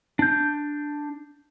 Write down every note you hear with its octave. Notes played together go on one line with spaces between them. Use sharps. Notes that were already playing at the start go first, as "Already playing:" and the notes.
D4 G6